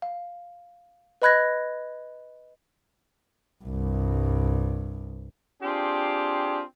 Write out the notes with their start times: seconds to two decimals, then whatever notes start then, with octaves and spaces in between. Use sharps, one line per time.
0.02 F5
1.22 B4 D#5 B5 F#6 G#6 A#6
3.65 C2 G2
5.62 C4 D4 F4 G4 G#4